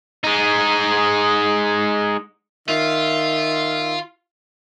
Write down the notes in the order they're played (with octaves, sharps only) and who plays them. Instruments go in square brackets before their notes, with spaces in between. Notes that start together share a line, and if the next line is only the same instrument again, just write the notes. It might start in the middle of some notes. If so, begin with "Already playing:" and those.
[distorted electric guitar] G#3 D#4
[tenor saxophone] D#3 [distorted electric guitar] F4 [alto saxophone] E5